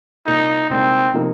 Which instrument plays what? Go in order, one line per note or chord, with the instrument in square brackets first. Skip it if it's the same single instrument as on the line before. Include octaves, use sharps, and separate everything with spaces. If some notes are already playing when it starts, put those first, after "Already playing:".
[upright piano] C2 A#2 A#3 F4 [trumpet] D#4
[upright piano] C2 A#2 G#3 D#4 A#4 [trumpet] C4
[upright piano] C3 F3 A#3 D#4